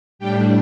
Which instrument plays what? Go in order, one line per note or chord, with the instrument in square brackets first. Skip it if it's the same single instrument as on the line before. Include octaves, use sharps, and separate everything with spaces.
[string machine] A2 G3 D4 G4 G5